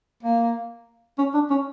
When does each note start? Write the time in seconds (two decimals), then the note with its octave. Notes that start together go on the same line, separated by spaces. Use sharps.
0.23 A#3
1.18 C#4
1.34 D4
1.50 C#4